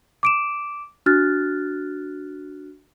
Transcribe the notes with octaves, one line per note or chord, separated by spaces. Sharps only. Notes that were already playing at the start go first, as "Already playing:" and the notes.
D6 D7 E7
D4 F#4 F6 F#6 A6